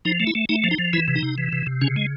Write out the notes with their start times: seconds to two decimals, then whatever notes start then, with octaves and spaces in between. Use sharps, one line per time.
0.05 F3 D#4
0.20 A3
0.27 E4
0.35 A3
0.49 A3 D#4
0.64 F3
0.71 D#4
0.79 F3
0.93 E3 E4
1.08 C3
1.15 D#4
1.23 C3
1.38 E3
1.53 C3
1.67 C3
1.81 C#3 C#4
1.96 G#3